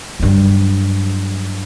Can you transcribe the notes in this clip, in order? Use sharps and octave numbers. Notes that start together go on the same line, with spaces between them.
G2 F#3